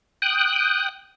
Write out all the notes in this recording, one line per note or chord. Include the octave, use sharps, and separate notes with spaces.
G5 D#6 F#6